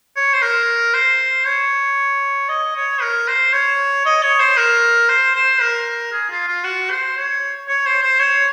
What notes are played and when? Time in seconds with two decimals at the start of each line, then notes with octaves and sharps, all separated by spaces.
0.16 C#5
0.34 C5
0.42 A#4
0.94 C5
1.47 C#5
2.49 D#5
2.76 C#5
3.02 A#4
3.28 C5
3.54 C#5
4.06 D#5
4.23 C#5
4.40 C5
4.57 A#4
5.09 C5
5.36 C5
5.61 A#4
6.13 G#4
6.30 F4
6.47 F4
6.64 F#4
6.90 C5
7.17 C#5
7.68 C#5
7.86 C5
8.03 C5
8.20 C#5